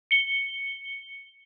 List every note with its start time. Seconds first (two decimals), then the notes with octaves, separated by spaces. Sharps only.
0.11 C#7 G7